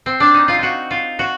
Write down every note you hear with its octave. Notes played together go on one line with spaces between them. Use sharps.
C4
D4
D#4
F4
F4 F#4
F4
F#4